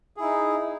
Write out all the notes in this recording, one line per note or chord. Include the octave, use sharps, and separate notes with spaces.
D#4 E4 G#4